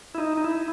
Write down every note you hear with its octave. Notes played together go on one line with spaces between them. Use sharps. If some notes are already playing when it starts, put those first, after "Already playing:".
E4
D#4
D#4
E4